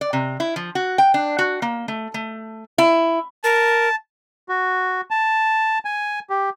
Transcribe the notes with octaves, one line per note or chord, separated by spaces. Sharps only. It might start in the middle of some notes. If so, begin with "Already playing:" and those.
D5
C3
E4
F3
F#4
G5
D4
F#4
A#3
A3
A3
E4
A#4 A5
F#4
A5
G#5
G4